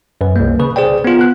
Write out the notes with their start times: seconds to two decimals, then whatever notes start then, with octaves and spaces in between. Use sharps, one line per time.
0.21 F#2 B4
0.36 C2 A#3
0.59 C#3 B4
0.76 G#4 C5 D5 G5
1.04 B3 F4
1.19 B3 F#6